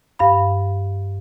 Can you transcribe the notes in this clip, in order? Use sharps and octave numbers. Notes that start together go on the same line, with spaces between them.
G2 F5 B5